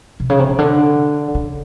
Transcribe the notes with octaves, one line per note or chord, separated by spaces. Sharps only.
C3
C#3
C3
C3
D3
C#3